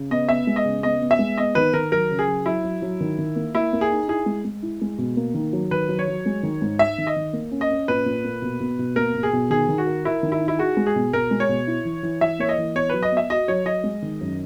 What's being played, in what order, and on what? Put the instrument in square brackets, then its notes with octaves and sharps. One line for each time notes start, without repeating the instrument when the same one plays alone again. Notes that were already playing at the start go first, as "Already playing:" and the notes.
Already playing: [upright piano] C#3
[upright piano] B3 [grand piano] D#5
[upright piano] B3 [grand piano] E5
[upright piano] G#3
[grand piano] D#5
[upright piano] C#3
[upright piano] B3 [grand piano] D#5
[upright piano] B3
[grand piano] E5
[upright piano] G#3
[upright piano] B3 [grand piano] D#5
[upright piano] D#3 [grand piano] B4
[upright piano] D#3 [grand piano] A#4
[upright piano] F#3 [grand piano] A#4
[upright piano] C#3
[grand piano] G#4
[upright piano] F#3
[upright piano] F#3 [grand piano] E4
[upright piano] F#3
F#3
D#3
D#3
A#3
[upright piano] A#3 [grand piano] E4
[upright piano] A#3
[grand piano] G#4
[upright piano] D#4
[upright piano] E4 [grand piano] G#4
[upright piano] G#3
G#3
E4
G#3
B2
A#3
D#3
F#3
[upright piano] D#3 [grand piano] B4
[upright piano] F#3
[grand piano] C#5
[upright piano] F#3
G#3
D#3
G#2
[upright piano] D#4 [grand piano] E5
[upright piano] D#3
[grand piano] D#5
[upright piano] D#3
A#3
C#4
[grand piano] D#5
[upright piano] C#4
[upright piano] A#2 [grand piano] B4
[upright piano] A#2
A#3
B2
B2
B2
[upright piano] A#3 [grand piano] A#4
[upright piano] B2
[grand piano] G#4
[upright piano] B2
[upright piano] D#3 [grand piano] G#4
[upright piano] D#3
[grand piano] F#4
[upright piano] A#4
[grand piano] E4 [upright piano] A#4
[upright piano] D#3
[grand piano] E4
[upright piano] D#4
[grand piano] E4
[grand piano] F#4 [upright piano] G#4
[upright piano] G#3
[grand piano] G#4
[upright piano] B2
[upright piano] B2 [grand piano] A#4
[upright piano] G#3
[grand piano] C#5
[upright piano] B2
E4
E3
E3
[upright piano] E3 [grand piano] E5
[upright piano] A#3 [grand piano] C#5
[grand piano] D#5
[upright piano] E3
[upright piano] B3 [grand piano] C#5
[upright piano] F#3 [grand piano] B4
[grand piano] D#5
[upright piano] B3
[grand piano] E5
[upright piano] F#4 [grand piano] D#5
[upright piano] F#3 [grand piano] C#5
[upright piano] F#3 [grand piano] D#5
[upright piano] G#3
D#3
F#2